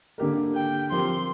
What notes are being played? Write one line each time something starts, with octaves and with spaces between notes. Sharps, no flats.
D3 A#3 G4 A#4
G5
F3 C4 G4 A#4 C6